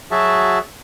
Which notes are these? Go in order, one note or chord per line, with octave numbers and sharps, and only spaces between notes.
F#3 F#4 G#4 E5 A5